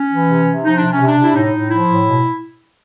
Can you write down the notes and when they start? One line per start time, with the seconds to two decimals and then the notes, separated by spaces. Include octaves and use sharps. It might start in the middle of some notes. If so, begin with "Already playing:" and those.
Already playing: C#4
0.11 E3
0.29 C3
0.47 C3
0.64 F3 D#4
0.78 C3 D4
0.92 C#4
1.00 C3
1.06 D4
1.18 C3
1.24 E4
1.35 A2 D#4
1.54 A2
1.71 F3 E4
1.89 A2
2.07 B2